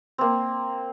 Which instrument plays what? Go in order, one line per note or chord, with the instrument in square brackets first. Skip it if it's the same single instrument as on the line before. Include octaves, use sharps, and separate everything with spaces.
[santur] A#3 C4